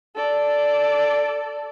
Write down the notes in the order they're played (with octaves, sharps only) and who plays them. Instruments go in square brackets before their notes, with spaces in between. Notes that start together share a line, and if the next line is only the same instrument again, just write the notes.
[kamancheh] A4 D5